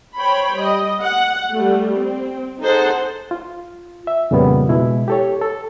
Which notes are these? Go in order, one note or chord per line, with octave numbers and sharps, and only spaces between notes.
C5 C#5 G5 B5
G3 D#5
F#5
G3 A3
C4
D#4 G#4 A4 C5 F#5 A5
F4
E5
F2 A#2 C#3 G3 B3
B2 G#3 E4
G4 A4 C#5
A4